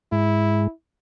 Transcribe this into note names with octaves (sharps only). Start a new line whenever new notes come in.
G#2 G#3 E4